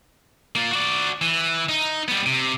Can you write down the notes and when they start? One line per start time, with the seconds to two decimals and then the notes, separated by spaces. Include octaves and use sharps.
0.56 A#3 F4
0.71 F#4 D5
1.22 E3
1.69 D#4
2.08 G3 B3
2.26 C3